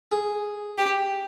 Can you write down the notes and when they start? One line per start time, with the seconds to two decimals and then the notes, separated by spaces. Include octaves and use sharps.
0.12 G#4
0.78 G4